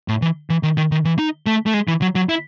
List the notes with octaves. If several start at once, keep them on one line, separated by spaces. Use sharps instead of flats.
A2
E3
E3
D#3
D#3
D#3
E3
D#4
A3
A3
G#3
E3
F#3
F#3
E4